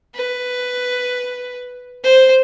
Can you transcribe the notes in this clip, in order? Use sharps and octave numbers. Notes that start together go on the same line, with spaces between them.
B4
C5